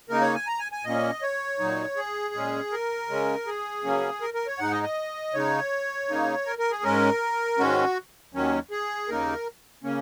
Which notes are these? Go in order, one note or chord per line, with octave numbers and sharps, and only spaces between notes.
C#3 A#3 D#4 A#4
C#5
G#5
A#5
G#5
G#5
A#2 A#3 C#4 D#5
C#5
A#2 F#3 D#4
G#4
A#2 G#3 C#4
A#4
C#3 G#3 C#4
G#4
C#3 F#3 A#3 C#4
A#4
A#4
C#5
G#2 G#3 D#4 F#5
D#5
D#5
C#3 G#3 D#4 C#5
C#3 A#3 D#4
A#4
A#4
G#4
G#2 G#3 C#4 A#4
G#2 D#3 G#3 C#4 F#4
D#2 D#3 F#3 C#4
G#4
D#2 C#3 A#3 D#4 A#4
C#3 A#3 C#4